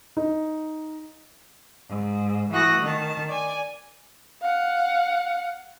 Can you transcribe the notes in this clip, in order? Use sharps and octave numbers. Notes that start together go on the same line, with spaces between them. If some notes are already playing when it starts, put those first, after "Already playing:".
D#4
G#2
E3 A3 F#4 D#6 F#6 A#6
D#3 A5
D5 G#5
F5 F#5